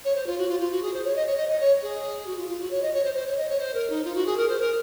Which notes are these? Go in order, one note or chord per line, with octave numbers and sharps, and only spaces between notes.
C#5
C5
F4
F#4
F4
F4
F#4
G#4
C5
C#5
D#5
C#5
D#5
D#5
C#5
G#4
F#4
F4
F4
F#4
C#5
D#5
C#5
C5
C5
C#5
D#5
C#5
C5
A#4
D#4
F4
F#4
G#4
A#4
C5
A#4